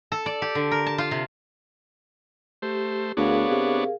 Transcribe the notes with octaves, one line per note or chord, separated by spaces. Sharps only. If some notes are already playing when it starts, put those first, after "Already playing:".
A4
D5
G4
D3
A#4
A5
F4
C3
A3 G4 C5
D2 B3 D4 G#4 A#4 C#5 F5
C3